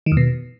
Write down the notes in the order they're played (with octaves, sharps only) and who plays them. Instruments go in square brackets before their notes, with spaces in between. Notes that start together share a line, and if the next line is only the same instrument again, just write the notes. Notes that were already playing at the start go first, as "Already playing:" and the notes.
[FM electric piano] D#3
E2
B2